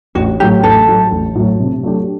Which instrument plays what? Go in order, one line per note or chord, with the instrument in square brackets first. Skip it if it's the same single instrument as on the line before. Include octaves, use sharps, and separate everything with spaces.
[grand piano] A1 [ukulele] F#4
[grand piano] A2 F#3 A3 [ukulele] G4
[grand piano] A1 [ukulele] A4
[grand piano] A2 F#3 A3
A1
A2 F#3 A3
C3
F#3 A3 D4 G4